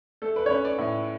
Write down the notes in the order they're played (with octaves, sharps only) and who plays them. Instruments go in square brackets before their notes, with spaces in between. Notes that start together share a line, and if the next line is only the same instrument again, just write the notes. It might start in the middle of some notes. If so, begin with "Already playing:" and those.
[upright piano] A3 A4
B4
C#5
C#4 B4
D5
A2